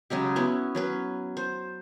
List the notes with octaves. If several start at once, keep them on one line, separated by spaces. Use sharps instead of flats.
C#3 F#3 G#3 G4
B3 C#4 E4 F#4
F#3 C#4 B4
C5